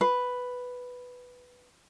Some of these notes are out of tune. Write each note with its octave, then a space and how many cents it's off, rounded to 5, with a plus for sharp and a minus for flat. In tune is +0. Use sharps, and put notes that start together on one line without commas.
B4 +5